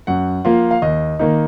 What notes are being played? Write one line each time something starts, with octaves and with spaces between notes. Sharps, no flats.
F#2 F#5
F3 A#3 F4
F5
D#2 D#5
D#3 A#3 D#4